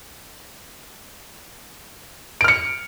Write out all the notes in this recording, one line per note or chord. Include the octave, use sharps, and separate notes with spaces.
F6 C#7 D7